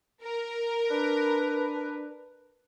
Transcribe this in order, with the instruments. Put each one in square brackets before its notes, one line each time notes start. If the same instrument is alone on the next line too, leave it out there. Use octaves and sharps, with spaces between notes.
[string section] A#4
[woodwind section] D4 B4